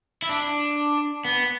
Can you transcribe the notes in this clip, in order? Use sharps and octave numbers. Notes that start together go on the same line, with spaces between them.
E4
D4
B3